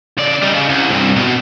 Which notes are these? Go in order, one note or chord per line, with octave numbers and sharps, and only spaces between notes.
C#3 D5
G3 D#4
C#3
C2
C2 G2
B2